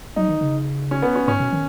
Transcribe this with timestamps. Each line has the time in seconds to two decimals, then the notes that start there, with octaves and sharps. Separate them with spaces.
0.16 F#3 D#4
0.28 D#3
0.41 C#3
0.91 C#4
1.02 B3
1.16 C#4
1.28 G#2 C#4
1.40 B2
1.53 D#3